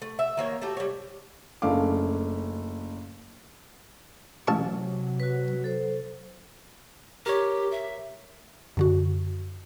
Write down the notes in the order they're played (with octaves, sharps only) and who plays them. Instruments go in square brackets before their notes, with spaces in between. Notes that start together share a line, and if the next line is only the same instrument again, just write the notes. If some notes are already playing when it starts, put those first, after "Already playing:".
[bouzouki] A3
E5
D#3 A#3 C#5
A3 F#4 G4 A4
G3 C#5
[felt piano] F#1 A3 C#4 D4 F5 D6
[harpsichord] A1 A5 C#6 [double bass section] C3 F#3
[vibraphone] F#4 B4
A4 C5
[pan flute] G4 [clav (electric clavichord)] A#4 C#5
[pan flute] E5
[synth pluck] F#2 D3 F#4